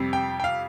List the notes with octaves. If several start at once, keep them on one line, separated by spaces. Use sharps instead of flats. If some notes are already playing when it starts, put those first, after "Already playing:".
Already playing: F2 C3 G3
G5
G5
F5